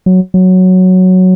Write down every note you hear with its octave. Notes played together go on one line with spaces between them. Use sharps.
F#3
F#3